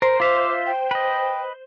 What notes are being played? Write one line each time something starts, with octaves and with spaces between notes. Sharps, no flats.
A#4 C5
F4 E5 F5 D6
G5
B4 D#5